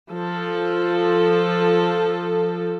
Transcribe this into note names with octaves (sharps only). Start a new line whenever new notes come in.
F3 A4